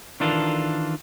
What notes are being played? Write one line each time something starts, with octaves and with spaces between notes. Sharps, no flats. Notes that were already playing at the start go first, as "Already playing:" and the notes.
D#3 E3 D4 F4 A4 A#4